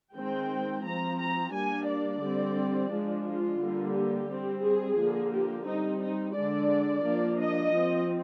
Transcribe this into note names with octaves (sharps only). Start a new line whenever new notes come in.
D#3 G#3 C4 G5
F3 C4 A#5
A#5
G3 A#3 D4 G#5
D5
D3 G3 C4
F3 G#3 D4
F4
D3 G3 A#3
G4
G3 C4
G#4
D3 F3 A#3
G4
G3 C4 D#4
D#4
D3 G#3 D4 D5
F3 A#3 D4
D#5
F3 C4